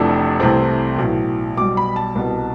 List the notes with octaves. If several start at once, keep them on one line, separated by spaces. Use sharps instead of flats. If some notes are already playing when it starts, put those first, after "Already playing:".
Already playing: F1 F2 E3 A3 D4
C2 C3 E3 A3 C4
B1 A2 E3
B1 B2 G3 D6
B5
A5
C2 B2 B3